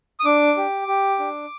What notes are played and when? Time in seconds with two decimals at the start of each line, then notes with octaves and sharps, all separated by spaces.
0.20 D#6
0.25 D4 D6
0.57 G4
0.88 G4
1.19 D4